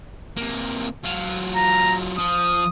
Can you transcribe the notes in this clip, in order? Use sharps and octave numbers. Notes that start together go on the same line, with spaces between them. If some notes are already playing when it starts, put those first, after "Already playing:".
C3 A#3
F#3 F4
A#5
F3 D#6